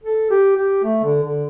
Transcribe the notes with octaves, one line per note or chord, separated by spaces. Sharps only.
A4
G4
G4
A3
D3
D3